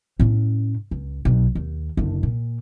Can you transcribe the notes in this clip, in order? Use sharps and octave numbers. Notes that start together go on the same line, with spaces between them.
A2 C#4
C#2
B1
D#2
F#1 D3
A#2